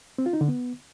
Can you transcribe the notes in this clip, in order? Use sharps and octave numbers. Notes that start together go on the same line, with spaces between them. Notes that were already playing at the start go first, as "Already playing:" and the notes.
C4
F4
D#4
D3
B3